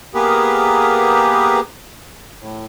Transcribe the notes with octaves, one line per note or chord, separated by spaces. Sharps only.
A#3 B3 G4 G#4 A#4 B4
A2